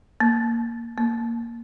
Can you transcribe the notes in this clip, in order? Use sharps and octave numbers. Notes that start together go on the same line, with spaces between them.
A#3
A#3